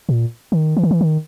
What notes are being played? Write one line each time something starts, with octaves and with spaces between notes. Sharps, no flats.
A#2
D#3
E3
D#3
E3
D#3